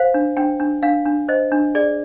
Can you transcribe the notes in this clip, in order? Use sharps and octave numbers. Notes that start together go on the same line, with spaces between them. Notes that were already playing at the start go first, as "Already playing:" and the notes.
Already playing: C5 F5
D4
D4 G5
D4
D4 F5
D4
C5 D#5
D4
G#4 D5